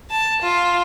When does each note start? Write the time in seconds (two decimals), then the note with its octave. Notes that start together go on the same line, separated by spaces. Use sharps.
0.10 A5
0.42 F4